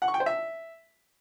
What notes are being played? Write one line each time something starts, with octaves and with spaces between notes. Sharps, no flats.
F#5
C#6
G5
C5
E5